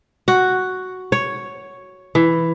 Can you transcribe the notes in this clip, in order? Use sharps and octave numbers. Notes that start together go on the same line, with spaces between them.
F#4
C#5
E3